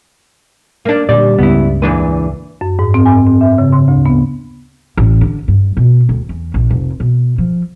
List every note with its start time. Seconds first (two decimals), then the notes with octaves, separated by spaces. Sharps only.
0.85 A#3 D4
1.09 A#2 D3 G3 D5
1.38 C#2 G2 C#3 B3 E4
1.82 E2 A#2 E3 D4 B4
2.61 F#2
2.79 G#2
2.94 C4
3.06 G#5
3.27 C4
3.41 E5
3.58 C#3
3.72 C6
3.88 D2
4.06 B3
4.97 A1
5.21 D3
5.48 G2
5.77 B2
6.09 D2
6.29 E2
6.54 A#1
6.71 F1
7.00 B2
7.38 F3